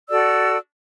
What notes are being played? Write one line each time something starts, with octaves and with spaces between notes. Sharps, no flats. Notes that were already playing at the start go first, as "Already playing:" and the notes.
F#4 A4 D5 E6